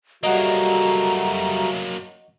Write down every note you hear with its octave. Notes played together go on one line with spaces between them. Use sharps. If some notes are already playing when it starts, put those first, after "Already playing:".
F#3 G3 A3 A#3 F#4 D#5 F#5 A#5